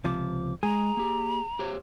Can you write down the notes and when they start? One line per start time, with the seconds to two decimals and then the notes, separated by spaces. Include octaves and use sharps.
0.04 C#2 C3 F3 D6
0.63 G#3 G#4 A#5
0.97 A#3 G4
1.59 G4 C5 C#5